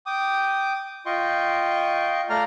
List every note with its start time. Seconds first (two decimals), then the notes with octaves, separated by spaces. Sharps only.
0.06 G5 D6 D#6
1.06 F4 D#5 G5 C6 C#6
2.30 A3 D5 F5 A#5 F6